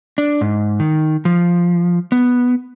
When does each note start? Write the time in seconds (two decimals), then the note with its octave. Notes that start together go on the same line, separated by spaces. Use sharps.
0.18 D4
0.41 G#2
0.80 D#3
1.25 F3
2.12 B3